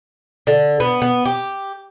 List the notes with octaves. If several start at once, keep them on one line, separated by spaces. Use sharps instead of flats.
D3
B3
B3
G4